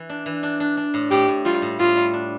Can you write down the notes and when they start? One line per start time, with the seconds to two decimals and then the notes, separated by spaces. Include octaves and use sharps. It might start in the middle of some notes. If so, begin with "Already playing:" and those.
Already playing: E3
0.09 D4
0.26 E3
0.43 D4
0.60 D4
0.77 D4
0.94 A2
1.11 A2 G4
1.28 A2
1.45 G3 F4
1.62 A2
1.79 A2 F4
1.97 G3
2.14 D4